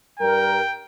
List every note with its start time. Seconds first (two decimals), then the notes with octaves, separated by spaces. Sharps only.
0.19 G2 G3 A#4 G5